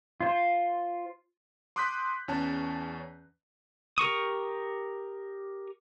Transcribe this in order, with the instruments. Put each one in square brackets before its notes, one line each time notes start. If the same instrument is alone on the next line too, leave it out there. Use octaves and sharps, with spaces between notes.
[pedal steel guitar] F4 C5
[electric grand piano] C6 D6 D#6 F#6 G6 B6
E2 C#4 A5
[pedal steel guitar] G4 A#4 C#6 D#6